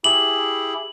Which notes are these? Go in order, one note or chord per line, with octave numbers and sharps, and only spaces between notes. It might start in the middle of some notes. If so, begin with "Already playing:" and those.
E4 G4 G#4 F#7